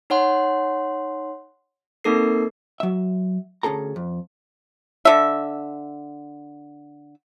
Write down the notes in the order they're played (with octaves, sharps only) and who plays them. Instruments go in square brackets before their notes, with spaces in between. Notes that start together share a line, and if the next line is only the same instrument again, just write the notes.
[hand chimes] D#4 C#5 F#5 C6
A#3 C4 D#4 A4 A#4 C7
[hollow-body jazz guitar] F#3 E5
D2 C#4 G#4 A4 A#5
F2
[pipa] D3 E5